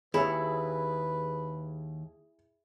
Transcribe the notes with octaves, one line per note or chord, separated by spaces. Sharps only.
D#2 E4 G#4 B4 C#5 E5